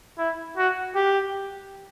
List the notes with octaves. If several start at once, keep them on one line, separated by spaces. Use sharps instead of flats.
E4
F#4
G4